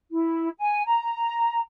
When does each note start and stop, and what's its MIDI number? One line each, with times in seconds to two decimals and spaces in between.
0.11 0.49 64
0.58 0.83 80
0.86 1.60 82